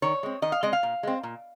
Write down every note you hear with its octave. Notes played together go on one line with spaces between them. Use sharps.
D#3 C#5
G#3 C4
D#3 D#5
F5
G#3 C4 D#5
F5
A#2
G#3 C4
A#2